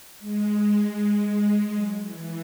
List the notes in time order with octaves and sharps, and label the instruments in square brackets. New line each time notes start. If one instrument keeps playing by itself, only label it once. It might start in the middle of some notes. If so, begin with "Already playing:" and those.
[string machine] G#3
G#3
G#3
F#3
E3